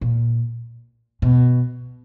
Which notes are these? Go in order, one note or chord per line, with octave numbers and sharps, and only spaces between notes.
A#2
B2